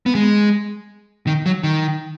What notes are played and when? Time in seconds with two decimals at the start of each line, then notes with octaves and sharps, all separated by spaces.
0.06 B3
0.15 G#3
1.27 D#3
1.46 F#3
1.63 D#3